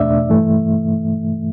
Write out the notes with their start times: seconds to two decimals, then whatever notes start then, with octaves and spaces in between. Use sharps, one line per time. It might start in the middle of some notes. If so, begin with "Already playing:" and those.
Already playing: E2 B2 A3 D4 D5 E5
0.29 G2 E3 A3